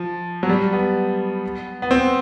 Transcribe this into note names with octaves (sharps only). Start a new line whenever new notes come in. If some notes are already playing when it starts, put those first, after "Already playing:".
Already playing: F3
F#3
G3
B3
B3
C4